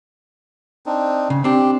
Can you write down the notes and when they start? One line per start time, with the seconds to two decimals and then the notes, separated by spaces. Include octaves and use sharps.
0.86 C4 D4 D#4
1.30 C#3
1.44 C4 D4 G4